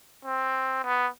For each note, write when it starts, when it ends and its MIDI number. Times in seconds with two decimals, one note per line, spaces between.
0.25 0.83 60
0.84 1.08 59